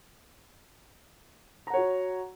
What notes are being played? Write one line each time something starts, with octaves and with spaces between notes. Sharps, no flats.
F#4 C#5 F#5 A#5